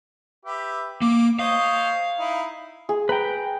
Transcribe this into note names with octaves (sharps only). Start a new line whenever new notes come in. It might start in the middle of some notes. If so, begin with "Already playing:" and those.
G4 B4 E5
A#3 D6
C5 C#5 D#5 F5
D#4 E4
G#4
B4 G5 A#5